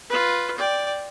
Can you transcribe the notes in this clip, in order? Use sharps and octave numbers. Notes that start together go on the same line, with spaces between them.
F4 B4
D5 G5